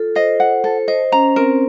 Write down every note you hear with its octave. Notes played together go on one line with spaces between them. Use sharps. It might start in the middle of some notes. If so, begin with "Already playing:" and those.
Already playing: F4 A4
C5 D#5
F#5
A4
C5 D#5
C#4 A#5
C4 A#4